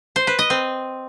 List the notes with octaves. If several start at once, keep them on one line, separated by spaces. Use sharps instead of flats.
C5
B4
D#5
C4